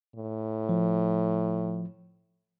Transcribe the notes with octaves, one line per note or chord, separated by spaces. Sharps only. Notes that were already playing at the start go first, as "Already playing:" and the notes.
A2
F3